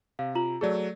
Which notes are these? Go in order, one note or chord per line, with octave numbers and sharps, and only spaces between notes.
C3 F5
F4 A#5 F#7
F#3 A3 G#4 A4 D5